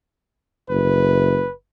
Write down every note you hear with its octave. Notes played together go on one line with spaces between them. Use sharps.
F#1 B4